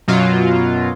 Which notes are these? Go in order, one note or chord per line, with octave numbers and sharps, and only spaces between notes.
F#2 B2 F#3 F4